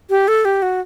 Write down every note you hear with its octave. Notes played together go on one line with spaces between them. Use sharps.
G4
A4
G4
F#4